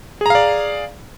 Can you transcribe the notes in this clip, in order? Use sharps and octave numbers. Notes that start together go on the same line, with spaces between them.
G#4 D5 F5 A#5